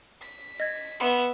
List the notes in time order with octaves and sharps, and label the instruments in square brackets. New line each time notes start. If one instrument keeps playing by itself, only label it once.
[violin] B6
[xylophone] D#5 G#6
[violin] B3 E5 [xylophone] F#5 B5 C6